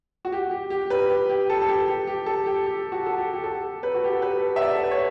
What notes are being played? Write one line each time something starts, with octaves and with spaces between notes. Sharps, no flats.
F#4
G4
G4
G4
B4
G4
G4
A4
A4
G4
G4
G4
A4
G4
G4
F#4
A4
G4
G4
A4
B4
F#4
G4
A4
B4
E5
D5
A4
B4
C#5